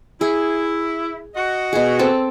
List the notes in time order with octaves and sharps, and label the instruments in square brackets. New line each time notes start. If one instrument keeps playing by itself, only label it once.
[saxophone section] E4 [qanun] G#4
[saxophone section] F#4 D#5
[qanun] B2 G#4
C4 A4